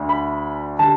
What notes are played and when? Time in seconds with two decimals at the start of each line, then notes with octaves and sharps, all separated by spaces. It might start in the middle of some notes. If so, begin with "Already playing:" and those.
Already playing: D2 D3 A3 D4
0.09 B5
0.79 D3 G3 A5